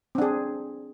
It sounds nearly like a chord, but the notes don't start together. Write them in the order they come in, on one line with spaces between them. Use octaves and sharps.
C4 D4 G#4